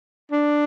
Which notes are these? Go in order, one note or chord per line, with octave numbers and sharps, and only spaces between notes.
D4